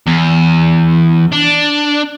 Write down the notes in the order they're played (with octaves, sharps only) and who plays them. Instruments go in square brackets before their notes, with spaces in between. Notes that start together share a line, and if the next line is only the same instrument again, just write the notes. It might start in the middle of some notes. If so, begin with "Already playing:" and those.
[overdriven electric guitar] E2
D4